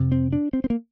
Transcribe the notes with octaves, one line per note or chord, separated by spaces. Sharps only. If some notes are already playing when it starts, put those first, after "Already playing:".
Already playing: F2 C3
C4
D4
C4
C4
A#3